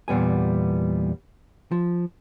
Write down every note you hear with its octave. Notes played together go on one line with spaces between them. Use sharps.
E2 A#2 G3 B3 G#5
F3